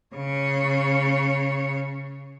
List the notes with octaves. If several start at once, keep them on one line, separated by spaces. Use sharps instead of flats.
C#3 C#5